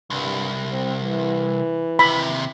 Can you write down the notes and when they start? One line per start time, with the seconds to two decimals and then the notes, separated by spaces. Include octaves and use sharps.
0.10 C2 G2
0.71 C4
1.02 E3
1.99 D#2 C3 B5